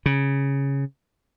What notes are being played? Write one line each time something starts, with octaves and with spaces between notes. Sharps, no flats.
C#3